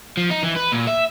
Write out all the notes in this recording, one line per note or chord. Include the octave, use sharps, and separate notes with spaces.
F3
D#4
E3
B4
A#2
E5